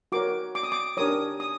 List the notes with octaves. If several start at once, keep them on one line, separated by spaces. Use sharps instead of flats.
F#4 A#4 C#5 D6
D6
D#6
D6
D4 G4 A#4 C#5 D#6
D#6